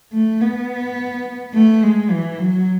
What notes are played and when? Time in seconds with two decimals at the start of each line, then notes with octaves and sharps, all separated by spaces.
0.13 A3
0.41 B3
1.54 A3
1.83 G#3
2.10 E3
2.39 F#3